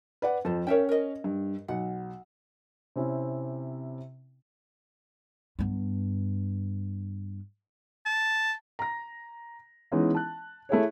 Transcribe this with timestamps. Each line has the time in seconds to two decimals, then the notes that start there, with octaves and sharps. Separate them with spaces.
0.22 B4 D5 F#5
0.45 F2 A4 C5
0.67 C#4 A#4 C#5 E5 G5
0.89 A#4 D#5
1.24 G2
1.68 B1 F#5
2.96 C3 C4 C#4 E4
5.59 G2 B3
8.06 A5
8.79 A#5 A#6
9.92 E3 G#3 B3 C#4 D#4 E4
10.15 A5 F#6
10.69 A3 E4 G#4 C#5